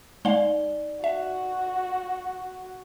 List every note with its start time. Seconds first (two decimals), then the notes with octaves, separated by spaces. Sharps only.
0.25 G#3 D#4 D5 F5 G7
1.04 F#4 E5